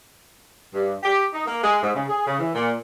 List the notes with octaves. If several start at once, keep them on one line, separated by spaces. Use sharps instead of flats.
G2
G4
D#4
A#3
G#3
G#2
C#3
G#4
C#3
E3
A#2